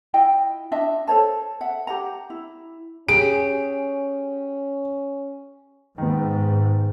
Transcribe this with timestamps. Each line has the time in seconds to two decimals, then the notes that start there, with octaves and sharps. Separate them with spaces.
0.14 E4 F4 D#5 G5
0.72 D4 F4 D#5 E5
1.07 A4 C5 C#5 A5
1.61 E5 F#5
1.87 G4 F#5 A#5
2.30 E4
3.09 C#4 G4 G#4 D7
5.98 G#2 D#3 B3